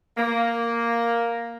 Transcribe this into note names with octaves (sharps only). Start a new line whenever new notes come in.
A#3